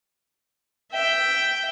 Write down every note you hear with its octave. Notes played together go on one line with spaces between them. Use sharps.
E5 G5